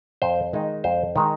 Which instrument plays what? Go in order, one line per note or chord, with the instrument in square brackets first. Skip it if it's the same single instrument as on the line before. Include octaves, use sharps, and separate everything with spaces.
[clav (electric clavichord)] F2 C5
D#3 G#3 D#4
F2 C5
D#3 G#3 D#4